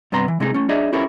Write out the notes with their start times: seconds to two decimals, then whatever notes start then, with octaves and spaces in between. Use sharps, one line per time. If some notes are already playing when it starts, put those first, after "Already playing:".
0.12 G2 C3 B3 A#5 C6
0.28 E3
0.40 C3 G#3 A3 D#4 F#4 G#4
0.54 A3 C#4
0.69 D4 D#4 G#4 C#5 D#5 E5
0.93 C#4 E4 G4 A4 A#4 C5